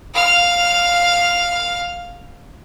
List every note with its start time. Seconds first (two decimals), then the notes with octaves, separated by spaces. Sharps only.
0.14 F5 F6